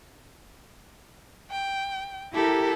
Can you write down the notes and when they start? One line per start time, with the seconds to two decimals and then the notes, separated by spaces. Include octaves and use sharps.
1.50 G5
2.35 E4 G4 A4 A#4